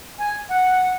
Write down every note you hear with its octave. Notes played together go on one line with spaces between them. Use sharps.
G#5
F#5